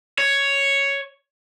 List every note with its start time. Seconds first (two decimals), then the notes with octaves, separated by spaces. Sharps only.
0.18 C#5